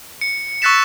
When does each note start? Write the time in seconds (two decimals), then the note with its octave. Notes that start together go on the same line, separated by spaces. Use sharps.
0.21 C#7
0.62 C#6 E6 F#6 A6 B6 E7